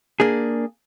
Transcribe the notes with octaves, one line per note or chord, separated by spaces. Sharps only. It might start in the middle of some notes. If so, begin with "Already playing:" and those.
A#3 D4 G#4